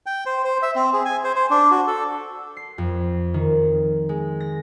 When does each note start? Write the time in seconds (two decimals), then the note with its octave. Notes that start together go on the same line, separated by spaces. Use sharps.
0.06 G5
0.26 C5
0.44 C5
0.62 E5
0.76 C4
0.93 G#4
1.05 G#5
1.24 C5
1.36 C5
1.50 D4
1.71 F#4
1.87 A4
2.57 C7
2.78 F2
3.34 D#3
4.09 G#3
4.40 A#6